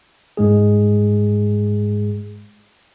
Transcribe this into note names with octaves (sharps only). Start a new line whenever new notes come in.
G#2 G#3 G#4